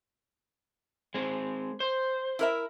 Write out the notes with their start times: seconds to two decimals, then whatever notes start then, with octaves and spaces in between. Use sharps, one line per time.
1.14 G#3 C4
1.80 C5
2.39 E4 A#4 E5